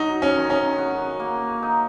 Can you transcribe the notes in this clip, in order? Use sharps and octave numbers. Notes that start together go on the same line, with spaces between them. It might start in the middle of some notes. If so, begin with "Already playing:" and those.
Already playing: F#3 D#4
C#4
D#3
C#4
F#4
A#3
D#4